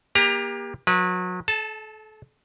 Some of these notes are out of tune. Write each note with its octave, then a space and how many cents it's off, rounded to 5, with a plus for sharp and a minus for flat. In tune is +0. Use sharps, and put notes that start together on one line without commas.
A#3 +30 G4 +30 A#5 +10
F#3 -30 B4 -30
A4 -35 A5 +0